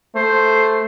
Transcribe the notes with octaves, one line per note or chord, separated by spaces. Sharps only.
A3 C5